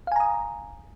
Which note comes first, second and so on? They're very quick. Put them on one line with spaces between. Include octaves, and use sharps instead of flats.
F5 G#5 A#5 D#6